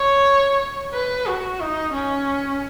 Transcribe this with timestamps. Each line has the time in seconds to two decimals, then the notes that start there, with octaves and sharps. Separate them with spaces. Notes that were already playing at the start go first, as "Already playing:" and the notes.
Already playing: C#5
0.94 B4
1.27 F#4
1.60 D#4
1.94 C#4